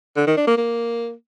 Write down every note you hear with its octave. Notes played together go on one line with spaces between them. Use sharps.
D3
D#3
D4
A#3
A#3